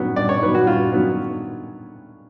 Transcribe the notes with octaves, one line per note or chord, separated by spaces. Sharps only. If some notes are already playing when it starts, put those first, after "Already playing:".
Already playing: G2 D#3 F#3 B3
G2 D5
C#5
D#3 F#3 B3 B4
F#4
G2 F4
D#3 F#3 B3